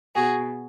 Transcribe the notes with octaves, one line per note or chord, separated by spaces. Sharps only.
B2 F#4 G#4